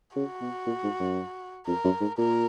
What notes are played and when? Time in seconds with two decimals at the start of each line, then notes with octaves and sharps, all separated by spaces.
0.16 C#3 F#4
0.41 B2
0.66 A#2
0.83 G#2
1.00 F#2
1.67 F2 A#4
1.84 F#2
2.00 G#2
2.18 A#2 A#4